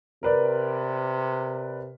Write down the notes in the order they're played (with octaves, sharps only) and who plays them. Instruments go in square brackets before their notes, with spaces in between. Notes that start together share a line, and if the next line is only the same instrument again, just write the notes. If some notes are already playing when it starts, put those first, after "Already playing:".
[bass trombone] C3 [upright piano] A#4 B4 D5